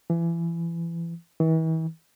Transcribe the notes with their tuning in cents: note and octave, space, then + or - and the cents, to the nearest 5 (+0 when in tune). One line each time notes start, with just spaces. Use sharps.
E3 +30
E3 -40